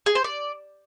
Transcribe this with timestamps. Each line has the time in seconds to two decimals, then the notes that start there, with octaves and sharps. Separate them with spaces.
0.06 G#4
0.15 C5
0.24 D5